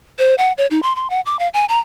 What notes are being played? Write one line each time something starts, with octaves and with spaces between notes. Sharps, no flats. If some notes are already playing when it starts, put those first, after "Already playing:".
C5
F#5
C#5
D#4
C6
C6
F#5
D6
F5
G#5
A#5